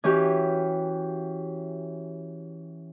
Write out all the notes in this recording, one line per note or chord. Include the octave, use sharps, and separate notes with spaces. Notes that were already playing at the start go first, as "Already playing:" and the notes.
E3 C#4 F#4 G4